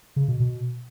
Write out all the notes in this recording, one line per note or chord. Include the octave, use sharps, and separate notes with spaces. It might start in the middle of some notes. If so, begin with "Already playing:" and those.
C#3
B2
B2